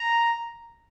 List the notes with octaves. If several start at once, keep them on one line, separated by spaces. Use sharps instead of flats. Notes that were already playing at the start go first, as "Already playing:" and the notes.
Already playing: A#5